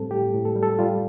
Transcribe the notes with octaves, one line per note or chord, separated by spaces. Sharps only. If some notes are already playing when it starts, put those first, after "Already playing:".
Already playing: A2 G3 C4 A4
A2 G4
A2
A4
G3
A4
G3 F4